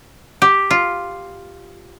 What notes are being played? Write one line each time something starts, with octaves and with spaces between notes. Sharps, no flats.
G4
F4